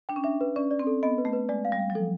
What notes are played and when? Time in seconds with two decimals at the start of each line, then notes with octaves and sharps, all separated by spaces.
0.09 D4 G5
0.16 C#4
0.24 D4 E5
0.41 B4
0.56 C#4 D5
0.71 D5
0.79 C4
0.87 A4
1.03 B3 D#5
1.18 B4
1.25 A3
1.33 B4
1.49 G#3 D5
1.65 F5
1.72 G3
1.79 F5
1.90 F#3
1.95 F3 A4